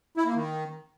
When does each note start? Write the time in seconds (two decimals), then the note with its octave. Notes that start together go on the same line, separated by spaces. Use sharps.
0.17 E4
0.26 A#3
0.34 D#3